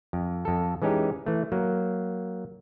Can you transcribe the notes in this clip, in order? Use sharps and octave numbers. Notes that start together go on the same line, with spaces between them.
F2
F2 A4
E3 G#3 C#4 D#4 G4
E3 A3
F#3 A#3